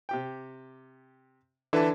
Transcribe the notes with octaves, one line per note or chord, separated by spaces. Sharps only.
C3 G4 G5
D3 E3 E4 A4 B4 E5 A5